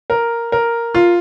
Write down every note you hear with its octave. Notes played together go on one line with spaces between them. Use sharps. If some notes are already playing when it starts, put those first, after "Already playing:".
A#4
A#4
F4